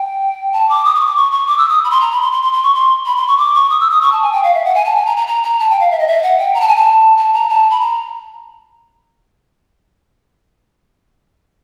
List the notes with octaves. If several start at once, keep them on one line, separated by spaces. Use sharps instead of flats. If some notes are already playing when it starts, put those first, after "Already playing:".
Already playing: G5
A5
D6
D#6
D6
C#6
D6
C#6
C#6
D6
E6
D#6
B5
C6
A#5
B5
C6
C6
C6
C6
C#6
C6
B5
C6
C#6
D6
C#6
D#6
E6
D#6
C#6
A5
G#5
G5
F5
E5
F#5
G#5
A5
G#5
A#5
A#5
A#5
A#5
A5
G5
F5
E5
D#5
E5
F#5
G5
A#5
A5
G#5
A5
A5
A#5
A5
B5
A#5